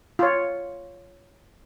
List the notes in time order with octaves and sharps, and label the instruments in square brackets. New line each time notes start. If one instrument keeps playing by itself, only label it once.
[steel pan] F4 C#5